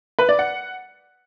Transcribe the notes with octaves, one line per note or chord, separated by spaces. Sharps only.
B4
D5
F#5